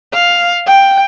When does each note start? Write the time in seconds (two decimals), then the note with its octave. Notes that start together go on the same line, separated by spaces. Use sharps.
0.13 F5
0.67 G5